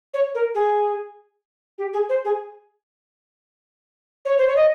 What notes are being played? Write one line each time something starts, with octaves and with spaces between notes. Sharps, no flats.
C#5
A#4
G#4
G4
G#4
C5
G#4
C#5
C5
C#5
D#5